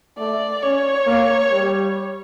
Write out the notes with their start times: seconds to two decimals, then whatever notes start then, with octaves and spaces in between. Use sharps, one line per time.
0.18 A3 D5
0.63 C#4 C#5
1.07 A#3
1.51 G3